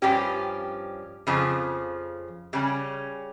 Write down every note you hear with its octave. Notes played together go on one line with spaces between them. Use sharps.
G2 F3 C#4 G4
F2 C#3 F3
C#3 G3 C#4